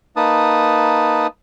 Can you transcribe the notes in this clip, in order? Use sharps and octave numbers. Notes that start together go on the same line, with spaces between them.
A#3 D#4 B4 A5 D#6